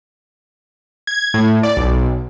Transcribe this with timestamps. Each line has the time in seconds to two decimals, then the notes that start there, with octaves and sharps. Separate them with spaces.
1.07 G#6
1.34 A2
1.63 D5
1.77 B1